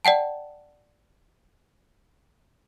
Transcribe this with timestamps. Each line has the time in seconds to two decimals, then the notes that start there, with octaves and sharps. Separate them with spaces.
0.05 D5 F#5 G5 A5